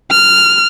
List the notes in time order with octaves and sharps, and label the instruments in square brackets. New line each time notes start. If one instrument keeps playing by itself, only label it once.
[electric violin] F6